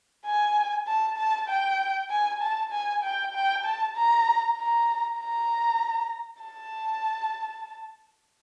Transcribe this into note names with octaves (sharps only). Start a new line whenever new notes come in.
G#5
A5
A5
G5
G#5
A5
G#5
G5
G5
A5
A#5
A#5
A#5
A5